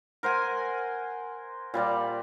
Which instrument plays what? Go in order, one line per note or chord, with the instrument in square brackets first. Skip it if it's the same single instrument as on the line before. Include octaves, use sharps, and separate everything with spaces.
[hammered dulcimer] A#4 C5 F#5 G#5
A#2 G3 D5